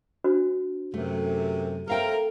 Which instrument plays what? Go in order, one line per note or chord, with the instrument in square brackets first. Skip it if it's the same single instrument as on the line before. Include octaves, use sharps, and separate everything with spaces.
[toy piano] D4 F#4 C5
[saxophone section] F#2 C3 [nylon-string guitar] A3
[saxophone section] C4 E4 A#4 [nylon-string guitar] A4 F5 G5